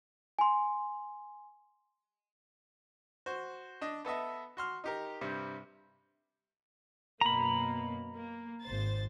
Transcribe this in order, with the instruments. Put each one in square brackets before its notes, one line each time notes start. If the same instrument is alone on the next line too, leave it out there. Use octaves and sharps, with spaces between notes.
[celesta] G#5 C6
[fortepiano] F#4 C5
D4 D#5
B3 A4 D#5 E5
F#4 C6 F6
D#4 G4 A#4
G2 C3 G3
[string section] F#2 B2 A#3 [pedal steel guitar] A#5 B5
[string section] A#3
G#1 C5 A6